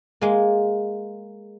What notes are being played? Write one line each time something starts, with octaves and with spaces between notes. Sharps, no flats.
G#3 A#3